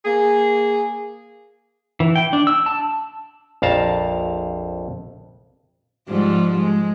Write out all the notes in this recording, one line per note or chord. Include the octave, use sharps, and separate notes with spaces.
A#3 G#4
E3
G5
D4
E6
A5
A#1 F2 F5 A5 A#5
G#2 F3 G3
G#3